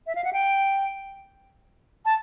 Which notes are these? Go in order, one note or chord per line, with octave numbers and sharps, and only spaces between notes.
E5
F5
F#5
G5
A5